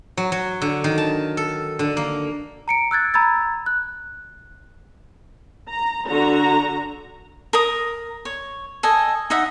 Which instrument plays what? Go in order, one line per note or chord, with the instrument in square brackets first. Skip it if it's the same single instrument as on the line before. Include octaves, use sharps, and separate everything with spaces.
[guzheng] F#3
F#3
D3
D#3
A5
A4
D3
A#3
[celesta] A#5 C#7 D7
E6 F#6 G#6 A6
A#5 B5 E6 G#6 A6
F#6
[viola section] A#5
D3 F#4 A#5
[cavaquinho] A#4 A#5 D#6
C#5
A4 D#5 G#5
D#4 D#5 E5 F#5